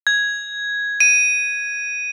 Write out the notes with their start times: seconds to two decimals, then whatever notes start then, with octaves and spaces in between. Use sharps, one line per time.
0.07 G#6
1.00 D#7